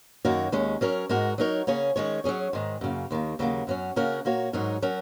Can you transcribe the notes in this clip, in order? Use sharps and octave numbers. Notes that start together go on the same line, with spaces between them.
F#2 D#3 A#3 F#4 C#5
D#2 D#3 G#3 C#4
F#3 C#4 A#4 C#5
G#2 G#3 F#4 A#4
F#3 D#4 A#4 C#5
C#3 A#3 C#4 G#4 C#5
D#3 G#3 C#4 G#4 C#5
F#3 C#4 G#4 C#5
G#2 D#3 G#3
F#2 C#3 A#3
D#2 D#3 A#3
D#2 C#3 F#3 A#3
F#2 F#3 C#4
C#3 A#3 C#4 F#4 A#4
A#2 A#3 F#4 C#5
G#2 F#3 D#4 A#4 C#5
F#3 C#4 A#4